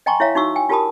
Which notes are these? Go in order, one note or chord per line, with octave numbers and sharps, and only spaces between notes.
D#5 G5 G#5 A#5 C6 C#6
E4 C#5 E5 F5 A#5
D#4 F#4 C#6 E6
G5 G#5
F4 G4 A#4 A5 B5 D#6